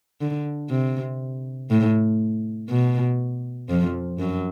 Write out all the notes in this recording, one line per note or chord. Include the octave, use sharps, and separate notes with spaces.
D3
C3
A2
B2
F2 F3
F#2 F#3